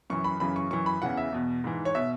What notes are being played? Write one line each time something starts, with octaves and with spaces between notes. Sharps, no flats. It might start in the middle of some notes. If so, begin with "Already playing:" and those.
F#2 E3 C#6
B5
F#2 C#3 E3 B5
C#6
F#2 E3 C#6
B5
E2 C#3 E3 F#5
E5
E2 B2
G#2 E3
C#5
B2 E5